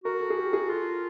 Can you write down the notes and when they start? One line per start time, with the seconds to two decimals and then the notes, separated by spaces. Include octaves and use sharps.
0.04 F#4 A#4
0.20 A4
0.30 G#4
0.36 G4
0.53 G#4
0.69 F4 A4